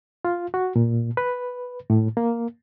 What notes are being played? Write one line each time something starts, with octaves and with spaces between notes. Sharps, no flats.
F4
F#4
A#2
B4
A2
A#3